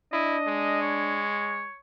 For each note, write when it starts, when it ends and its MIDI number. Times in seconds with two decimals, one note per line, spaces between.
0.13 1.24 62
0.13 0.38 64
0.13 0.79 75
0.47 1.69 56
0.82 1.78 73